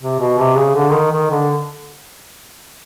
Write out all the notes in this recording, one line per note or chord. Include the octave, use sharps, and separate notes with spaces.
C3
B2
C3
C#3
D3
D#3
D#3
D3